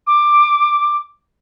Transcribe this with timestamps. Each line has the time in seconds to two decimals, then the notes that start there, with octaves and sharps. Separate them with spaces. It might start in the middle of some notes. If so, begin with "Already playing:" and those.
0.07 D6